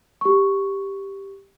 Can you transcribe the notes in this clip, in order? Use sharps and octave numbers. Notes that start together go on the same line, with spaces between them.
G4 C#6